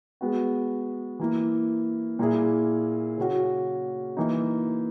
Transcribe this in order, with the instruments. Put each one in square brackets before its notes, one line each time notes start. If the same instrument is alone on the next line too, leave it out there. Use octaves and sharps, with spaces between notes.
[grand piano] G#3 B3 F#4
E3 A#3 E4
A#2 A#3 E4 G#4
C#3 F#3 C#4 F#4
E3 A#3 D#4